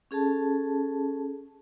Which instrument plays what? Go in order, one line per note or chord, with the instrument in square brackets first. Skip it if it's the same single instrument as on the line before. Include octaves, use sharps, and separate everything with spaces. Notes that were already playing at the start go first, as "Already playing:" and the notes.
[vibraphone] C#4 G#4 A4 A5